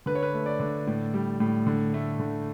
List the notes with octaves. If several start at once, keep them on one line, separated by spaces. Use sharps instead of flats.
D3 B4
C#5
B4
A3
D5
D3
A2
G3
A2
D3
A3
D3